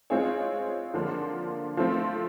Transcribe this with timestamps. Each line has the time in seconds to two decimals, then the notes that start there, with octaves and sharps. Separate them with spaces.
0.10 G#3 C4 F4 G#4 C#5
0.94 D3 F3 A#3
1.77 F3 A3 C4